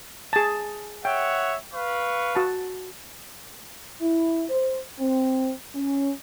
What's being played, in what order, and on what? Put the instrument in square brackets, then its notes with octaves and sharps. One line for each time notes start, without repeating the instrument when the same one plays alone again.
[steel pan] G#4 A5
[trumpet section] C#5 E5 F#5 [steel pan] G5
[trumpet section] B4 F5 C#6
[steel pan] F#4 A5
[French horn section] E4
C5
C4
C#4